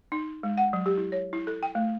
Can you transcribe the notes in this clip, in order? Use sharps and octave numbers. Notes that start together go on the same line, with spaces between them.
D#4
G#3
F#5
F#3
G4
E4
C#5
E4
A4
G5
A3